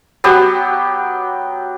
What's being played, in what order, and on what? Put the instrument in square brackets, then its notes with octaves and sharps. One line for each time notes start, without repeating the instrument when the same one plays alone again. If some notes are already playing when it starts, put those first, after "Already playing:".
[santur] F#3 B3 G4